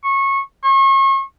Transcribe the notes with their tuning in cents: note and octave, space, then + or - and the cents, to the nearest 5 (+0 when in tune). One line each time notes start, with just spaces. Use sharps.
C#6 -20
C#6 -35